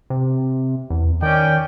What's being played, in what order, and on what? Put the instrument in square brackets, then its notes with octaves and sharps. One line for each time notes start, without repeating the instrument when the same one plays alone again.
[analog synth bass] C3
E2
[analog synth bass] D#3 [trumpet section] C#4 D5 G5